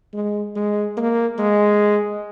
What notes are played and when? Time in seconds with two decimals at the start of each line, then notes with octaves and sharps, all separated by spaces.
0.13 G#3
0.55 G#3
0.97 A#3
1.39 G#3